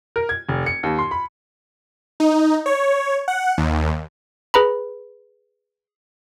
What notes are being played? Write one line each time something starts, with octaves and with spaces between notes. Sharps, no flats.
A#4
G#6
F1
C#7
D#2
C6
B5
D#4
C#5
F#5
D#2
G#4 B4 A#5 B5